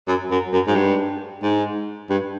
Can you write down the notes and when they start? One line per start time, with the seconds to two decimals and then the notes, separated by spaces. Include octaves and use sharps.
0.08 F#2
0.31 F#2
0.53 F#2
0.67 G#2
0.75 G2
1.43 G#2
2.10 G2